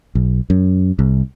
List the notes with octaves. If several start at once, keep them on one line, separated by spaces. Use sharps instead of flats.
B1
F#2
C2